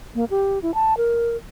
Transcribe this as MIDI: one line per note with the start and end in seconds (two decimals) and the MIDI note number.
0.15 0.25 58
0.30 0.59 67
0.62 0.74 64
0.74 0.96 81
0.97 1.36 70